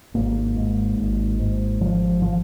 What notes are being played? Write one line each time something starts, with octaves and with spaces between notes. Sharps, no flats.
G#1 A#3
G#2
G#1
G#2
G#1 F3
F3